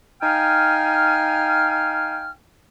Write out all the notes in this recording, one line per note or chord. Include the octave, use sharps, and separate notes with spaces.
D#4 F5 G5 G#5 F6